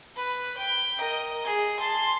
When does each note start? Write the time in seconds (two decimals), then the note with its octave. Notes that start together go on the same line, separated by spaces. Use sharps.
0.16 B4
0.57 G5
0.98 A#4 D#5
1.45 G#4
1.80 A5 C6